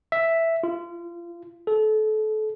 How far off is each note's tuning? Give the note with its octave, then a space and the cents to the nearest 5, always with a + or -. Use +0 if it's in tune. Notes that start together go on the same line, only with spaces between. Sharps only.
E5 +0
F4 -30
A4 -30